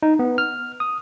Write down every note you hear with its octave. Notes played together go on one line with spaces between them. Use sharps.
D#4
B3
F6
D#6